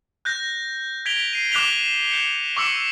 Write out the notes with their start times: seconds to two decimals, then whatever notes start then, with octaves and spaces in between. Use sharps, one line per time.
0.25 F#6 G6 A#6
1.06 G#6 B6 D7 F7 G7
1.33 C7 D#7
1.52 D6 F#6 B6 F7 G7
2.11 G6 C#7
2.57 C#6 D6 E6 C#7